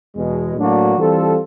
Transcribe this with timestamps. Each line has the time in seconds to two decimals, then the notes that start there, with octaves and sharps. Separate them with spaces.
0.16 E2 B2 G#3
0.56 A2 F#3 A#3 D4 F#4
0.97 E3 G3 C4 F4 A4